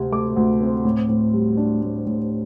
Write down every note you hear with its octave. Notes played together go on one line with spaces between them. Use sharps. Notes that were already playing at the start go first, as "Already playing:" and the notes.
Already playing: D2 C3 C4
A3 D6
D2
C4
A2
A2
G3
D4
A2
A2